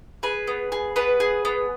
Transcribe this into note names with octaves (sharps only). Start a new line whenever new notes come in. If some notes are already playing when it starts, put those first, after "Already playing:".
G#4 B4
B3
G#4
B3 B4
G#4
B3